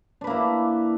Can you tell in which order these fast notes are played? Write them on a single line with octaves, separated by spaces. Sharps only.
D4 B4 A#3 E4